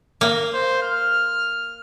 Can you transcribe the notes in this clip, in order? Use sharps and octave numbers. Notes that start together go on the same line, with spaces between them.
A#3
C5
F6